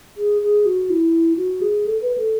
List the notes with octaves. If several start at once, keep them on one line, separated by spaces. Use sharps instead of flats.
G#4
G#4
F#4
E4
F#4
G#4
A4
B4
A4